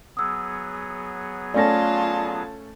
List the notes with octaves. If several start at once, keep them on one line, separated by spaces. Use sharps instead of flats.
F#3 B3 G#4 D#6 E6
A3 C#4 F4 A4 D5 G#5 A5 A#6